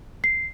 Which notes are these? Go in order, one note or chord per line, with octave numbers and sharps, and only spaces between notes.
C7